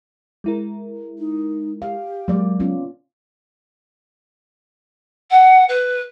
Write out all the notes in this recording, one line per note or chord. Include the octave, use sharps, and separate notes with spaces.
G#3 E4 A#4
D#4
G4 F5
F#3 G#3 A#3 D5
B3 C#4 F4
F#5
B4